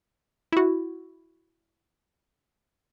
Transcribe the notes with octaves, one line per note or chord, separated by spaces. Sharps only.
E4 F#4